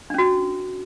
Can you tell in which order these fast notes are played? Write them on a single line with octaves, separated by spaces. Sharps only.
D4 C#4 F#4